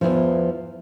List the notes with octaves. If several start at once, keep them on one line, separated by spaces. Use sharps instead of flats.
E2 A2 E3 F3